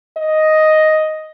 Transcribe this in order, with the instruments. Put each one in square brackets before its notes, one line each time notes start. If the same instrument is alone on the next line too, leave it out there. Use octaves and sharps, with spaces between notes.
[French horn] D#5